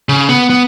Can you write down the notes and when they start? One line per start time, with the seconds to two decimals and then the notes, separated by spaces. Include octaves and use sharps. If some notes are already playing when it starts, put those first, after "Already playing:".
0.09 C#3
0.29 B3
0.50 B3